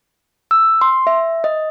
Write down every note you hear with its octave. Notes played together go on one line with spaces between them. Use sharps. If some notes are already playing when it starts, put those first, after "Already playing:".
E6
C6
E5
D#5